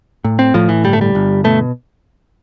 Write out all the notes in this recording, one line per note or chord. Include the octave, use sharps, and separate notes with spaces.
A2
C4
A2 F3
E3
G1 G3
A3
G3
G1
B2 A3